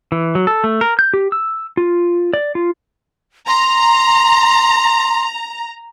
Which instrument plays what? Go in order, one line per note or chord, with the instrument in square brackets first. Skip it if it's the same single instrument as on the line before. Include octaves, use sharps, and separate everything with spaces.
[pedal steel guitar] E3
F#3
A4
A3
A#4
G6
G4
E6
F4
D5
F4
[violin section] A#5 [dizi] C6